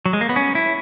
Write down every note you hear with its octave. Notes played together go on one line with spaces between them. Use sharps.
F#3
G#3
A#3
B3
C#4
E4